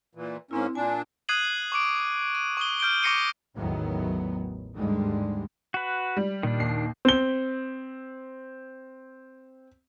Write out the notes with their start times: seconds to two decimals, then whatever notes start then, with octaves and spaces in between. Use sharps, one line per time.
0.15 A#2 E3
0.51 G#2 A#3 C4 C#4 E4
0.75 A#2 D4 G#5
1.29 D#6 F#6 G#6 C7 D#7 F#7
1.72 C#6 D6 D7
2.35 D#7
2.57 C#6 D#6 G7
2.80 F6 G6 D7 G7
3.03 C#6 D6 A#6 C7 C#7 D#7
3.55 A1 E2 A2 D#3 F#3 B3
4.75 D#2 G#2 D3 G3 G#3
5.74 F#4 B4
6.17 G3
6.43 A#2 D#3 D4
6.60 D#2 C7
7.05 C4 G7